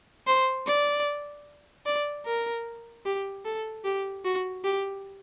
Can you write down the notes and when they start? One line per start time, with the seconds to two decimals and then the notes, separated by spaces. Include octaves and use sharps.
0.27 C5
0.67 D5
1.86 D5
2.26 A#4
3.06 G4
3.45 A4
3.85 G4
4.25 F#4
4.64 G4